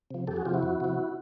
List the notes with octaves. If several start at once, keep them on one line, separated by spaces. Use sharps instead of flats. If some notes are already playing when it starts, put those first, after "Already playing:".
C3 F3
F2 G4 A4
F#4 G#4
C3 F3 F4 G4
E4 F#4
F2
C3 F3